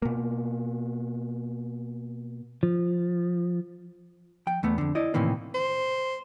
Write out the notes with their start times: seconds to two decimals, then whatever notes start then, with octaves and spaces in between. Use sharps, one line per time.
0.02 B2 A#3
2.63 F3
4.47 F3 G5
4.63 E2 A3 B3
4.78 F2 D3
4.95 E4 D5 D#5
5.14 A2 C3 D#3 E3 A#3
5.54 C5